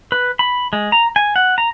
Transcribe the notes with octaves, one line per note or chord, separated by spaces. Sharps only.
B4
B5
G#3
A#5
G#5
F#5
A#5